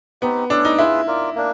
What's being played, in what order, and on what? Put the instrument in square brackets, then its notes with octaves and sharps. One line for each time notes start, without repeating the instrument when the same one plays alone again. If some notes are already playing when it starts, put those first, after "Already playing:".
[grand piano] B3 [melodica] C4 D#4 G4
[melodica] C#4 E4 A4 [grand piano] D4
[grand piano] D#4
[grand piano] E4 [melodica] F4 G#4 B4 E5
[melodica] F4 A#4 D5
A#3 D4